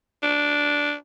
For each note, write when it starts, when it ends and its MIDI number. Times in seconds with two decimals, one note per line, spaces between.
0.23 0.94 62